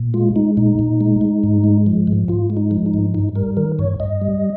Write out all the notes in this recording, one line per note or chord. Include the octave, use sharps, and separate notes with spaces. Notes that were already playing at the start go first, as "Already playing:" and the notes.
Already playing: A#2
G#3 F4
G#3 D#4
A#2 D#4
A#2
G#3
G#3
G#2
G#3
F3
G#2
G#2 F4
G#3
D#4
F3
D#4
G#2
G2 D#4
G3 A#4
D#3 A#4
G2 C#5
G2 D#5
G3